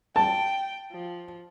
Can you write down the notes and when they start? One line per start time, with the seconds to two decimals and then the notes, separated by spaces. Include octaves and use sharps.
0.16 G5 A5
0.92 F3